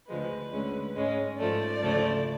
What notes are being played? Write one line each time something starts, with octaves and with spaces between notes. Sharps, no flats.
D2 D3 F3 G#3 B4
D2 D3 G#3 C#4
G#2 G#3 C#4
G#2 F3 A3 D5
D2 C#3 F3 A3